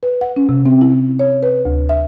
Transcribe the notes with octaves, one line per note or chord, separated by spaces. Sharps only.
B4
F#5
C#4
C3
C4
E4
C#5
B4
D2
E5